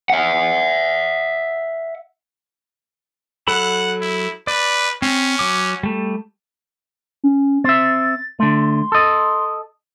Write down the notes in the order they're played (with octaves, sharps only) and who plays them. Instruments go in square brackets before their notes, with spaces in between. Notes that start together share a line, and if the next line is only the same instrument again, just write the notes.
[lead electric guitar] E5 F#5
[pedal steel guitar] F#3 A4 B5 [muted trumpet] F#5
[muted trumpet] E4
[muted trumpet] B4 [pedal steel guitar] D5
[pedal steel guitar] C4 [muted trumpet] C#4
[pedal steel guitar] F#3 D6
G3 A3
[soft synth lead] C#4
[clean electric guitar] C4 E5 [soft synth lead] A6
[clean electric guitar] D3 A3 [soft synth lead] C6
[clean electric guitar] A4 D#5